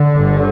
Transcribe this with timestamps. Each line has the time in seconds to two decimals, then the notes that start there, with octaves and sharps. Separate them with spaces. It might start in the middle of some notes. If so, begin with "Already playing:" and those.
Already playing: D3
0.14 G1 G2